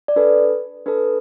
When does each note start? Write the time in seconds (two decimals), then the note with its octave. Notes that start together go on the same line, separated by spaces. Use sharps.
0.08 D5
0.16 D4 A4 B4
0.86 D4 A4 B4